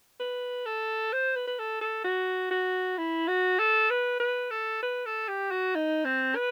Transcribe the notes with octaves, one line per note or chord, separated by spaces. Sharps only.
B4
A4
C5
B4
B4
A4
A4
F#4
F#4
E4
F#4
A4
B4
B4
A4
B4
A4
G4
F#4
D#4
C4
B4